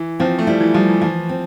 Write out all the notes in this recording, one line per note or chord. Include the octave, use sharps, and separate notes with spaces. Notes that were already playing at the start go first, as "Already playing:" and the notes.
Already playing: E3
F3 C4
A3
G3 E4
E3
F3 G3
E3
E3 F3
C4